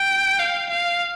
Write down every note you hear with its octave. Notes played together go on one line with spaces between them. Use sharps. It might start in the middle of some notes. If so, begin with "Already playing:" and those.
Already playing: G5
F5
F5